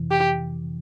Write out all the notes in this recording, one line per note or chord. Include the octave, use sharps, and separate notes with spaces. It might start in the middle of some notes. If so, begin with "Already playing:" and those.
Already playing: F2 C3 E3
G4